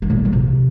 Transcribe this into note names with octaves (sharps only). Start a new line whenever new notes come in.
D3
A2
A#2
F3
C3